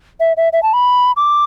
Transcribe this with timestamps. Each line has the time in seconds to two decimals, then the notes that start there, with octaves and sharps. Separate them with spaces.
0.20 E5
0.37 E5
0.53 E5
0.63 A5
0.73 B5
1.16 D6